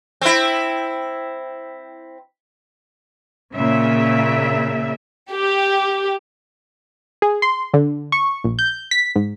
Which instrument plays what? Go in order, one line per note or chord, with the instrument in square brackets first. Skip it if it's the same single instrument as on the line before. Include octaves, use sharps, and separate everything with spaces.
[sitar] C4 E4
[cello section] A#2 C#3 E5
[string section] G4
[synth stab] G#4
C6
D3
C#6
A#1
G6
B6
G#2